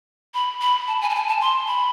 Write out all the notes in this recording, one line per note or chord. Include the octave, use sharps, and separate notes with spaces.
B5
B5
A5
G#5
A5
G#5
A5
C6
B5